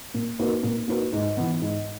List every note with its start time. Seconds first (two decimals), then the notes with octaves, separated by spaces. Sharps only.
0.14 A#2
0.39 A#3 D#4 F#4 B4
0.63 A#2
0.88 A#3 D#4 F#4 B4
1.13 G#2
1.37 E3 B3
1.62 G#2